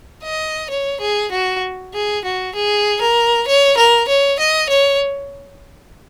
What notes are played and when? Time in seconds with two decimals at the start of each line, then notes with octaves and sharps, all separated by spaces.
0.24 D#5
0.70 C#5
1.01 G#4
1.31 F#4
1.94 G#4
2.25 F#4
2.55 G#4
3.01 A#4
3.47 C#5
3.77 A#4
4.08 C#5
4.39 D#5
4.69 C#5